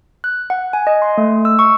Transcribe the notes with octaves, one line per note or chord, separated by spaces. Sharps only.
F#6
F#5
G#5
D#5
C6
A3
E6
C#6